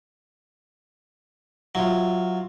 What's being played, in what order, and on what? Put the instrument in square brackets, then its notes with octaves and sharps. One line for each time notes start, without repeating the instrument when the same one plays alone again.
[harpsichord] F#3 [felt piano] E4 F4